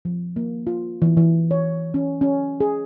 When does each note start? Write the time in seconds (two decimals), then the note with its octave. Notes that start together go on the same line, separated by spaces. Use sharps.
0.05 F3
0.36 A#3
0.67 F4
1.02 E3
1.17 E3
1.51 C#5
1.94 C#4
2.21 C#4
2.60 G#4